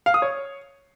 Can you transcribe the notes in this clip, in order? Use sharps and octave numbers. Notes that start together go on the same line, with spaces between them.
F5
D#6
C#5